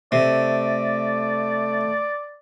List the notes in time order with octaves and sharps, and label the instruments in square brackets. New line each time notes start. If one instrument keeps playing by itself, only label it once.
[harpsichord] C3 [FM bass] A3 [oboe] D5